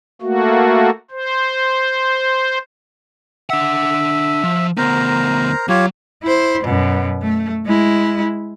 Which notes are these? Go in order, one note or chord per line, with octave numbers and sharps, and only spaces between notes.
A3 A#3 F#4
C5
D4 E5 F#5
F3
D2 B3 A#4 C5 A#5
F#3 F4 G4 C#5
E4 C5
F#2 B2
A3
G#3 E4